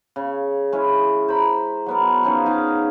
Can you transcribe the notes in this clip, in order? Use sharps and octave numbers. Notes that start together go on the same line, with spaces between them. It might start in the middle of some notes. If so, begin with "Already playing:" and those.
C#3
G#3 C#4 E4
C5 A#5 B5
F#3 B3 A#4
F3 C#4 D#4 G#4
D#4 G#4 F5